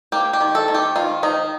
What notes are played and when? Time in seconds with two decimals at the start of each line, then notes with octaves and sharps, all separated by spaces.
0.12 A#3 G4
0.33 G4
0.41 D#3
0.55 A4
0.68 D#3
0.74 G4
0.96 D#3 F4
1.23 D#3 D#4